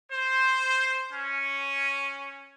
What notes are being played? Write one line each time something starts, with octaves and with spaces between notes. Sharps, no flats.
C5
C#4